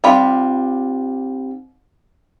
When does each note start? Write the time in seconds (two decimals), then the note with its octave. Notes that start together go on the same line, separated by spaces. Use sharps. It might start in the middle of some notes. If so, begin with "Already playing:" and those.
0.04 G3 C4 D#4 F4 B5